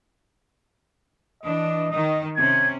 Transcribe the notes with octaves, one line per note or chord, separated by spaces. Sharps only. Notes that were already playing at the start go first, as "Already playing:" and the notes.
E3 D4 D#5
D#3 D#4 D#5
C3 C#4 G#6